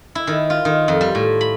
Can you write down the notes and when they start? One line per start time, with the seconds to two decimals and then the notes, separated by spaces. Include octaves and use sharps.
0.15 E4
0.27 D#3
0.50 F4
0.65 D#3
0.88 F2
1.01 G3
1.15 A2
1.41 B5